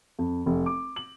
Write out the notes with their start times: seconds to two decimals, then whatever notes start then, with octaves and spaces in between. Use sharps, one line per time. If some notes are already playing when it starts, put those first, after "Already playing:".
0.19 F2
0.46 F1
0.66 D6
0.96 F#7